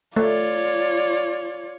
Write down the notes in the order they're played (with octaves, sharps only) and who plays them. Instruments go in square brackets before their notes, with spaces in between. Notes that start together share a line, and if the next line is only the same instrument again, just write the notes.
[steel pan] A3 [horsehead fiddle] F4 C#5 [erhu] D5